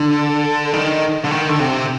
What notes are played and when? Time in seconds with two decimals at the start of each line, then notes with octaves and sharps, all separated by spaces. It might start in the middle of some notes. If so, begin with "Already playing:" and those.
Already playing: D3
0.73 D#3
1.24 D3
1.31 D#3
1.49 D3
1.59 C3